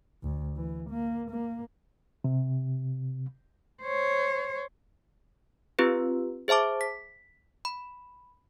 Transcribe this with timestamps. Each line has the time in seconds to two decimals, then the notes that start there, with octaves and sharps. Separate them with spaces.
0.23 D2
0.56 E3
0.90 A#3
1.30 A#3
2.24 C3
3.83 C5 C#5
5.79 C4 F4 G4 B4
6.48 G#4 C5 E5 A5 D6
6.81 B6
7.65 B5